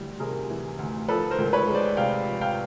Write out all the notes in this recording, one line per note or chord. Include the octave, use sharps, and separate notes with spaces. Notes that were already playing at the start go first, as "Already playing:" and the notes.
Already playing: D2 E3 G3
C3 G#4 A#4
E3
D2
F3 A4 B4
A#4 C5
C#2
B4 C#5
G#3
C5 D5
C3 F5 G5
F3
F5 G5